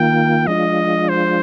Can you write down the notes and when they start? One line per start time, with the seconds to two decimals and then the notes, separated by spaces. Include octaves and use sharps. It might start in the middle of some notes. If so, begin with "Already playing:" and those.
Already playing: D#3 A#3 F4 G5
0.47 F3 G#3 D4 F4 D#5
1.09 C5